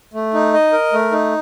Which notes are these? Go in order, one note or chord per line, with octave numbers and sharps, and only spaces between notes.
A3
D#4
D#5
A#4
A3
D#4